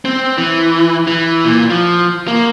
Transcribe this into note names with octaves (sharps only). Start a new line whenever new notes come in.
C4
E3
E3
A#2
F3
A#3